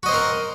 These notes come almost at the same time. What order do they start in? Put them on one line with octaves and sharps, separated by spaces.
F#4 D#5 C5 C4 A#4